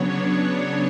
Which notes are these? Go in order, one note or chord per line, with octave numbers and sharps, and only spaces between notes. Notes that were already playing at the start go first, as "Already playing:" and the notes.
Already playing: C#3 F#3 B3 D4 C#5